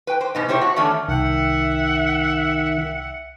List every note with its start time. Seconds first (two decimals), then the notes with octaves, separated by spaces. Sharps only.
0.07 B4 G5
0.21 C5
0.35 G#2 B2 D#4
0.48 A2 C3 E4 G4 C5 C#5
0.61 F#4
0.76 E2 D3 D#3 A3 C#4
1.08 C2 D#3 E5 F#5 G5